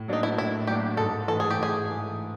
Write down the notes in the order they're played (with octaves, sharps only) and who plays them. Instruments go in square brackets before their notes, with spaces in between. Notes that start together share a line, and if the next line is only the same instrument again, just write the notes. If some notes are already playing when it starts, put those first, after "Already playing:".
Already playing: [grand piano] A2
[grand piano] F#3 A#3 D4 [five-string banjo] D#4
[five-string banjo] E4
[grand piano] A2 [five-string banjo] E4
[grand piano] F#3 A#3 D4 [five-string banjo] G4
[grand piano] G#2 [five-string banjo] A4
[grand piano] E3 A3 [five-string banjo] A4
[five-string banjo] G#4
G4
[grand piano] G#2 [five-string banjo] G#4
[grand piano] E3 A3